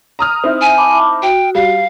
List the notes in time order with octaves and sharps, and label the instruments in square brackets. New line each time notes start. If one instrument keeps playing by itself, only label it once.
[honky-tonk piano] A#5 D#6 F6
C4 D#4 E4
[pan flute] G#5
[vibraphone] A5 B5 D6
[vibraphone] F#4 [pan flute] G5
[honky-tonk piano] G3 [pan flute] F5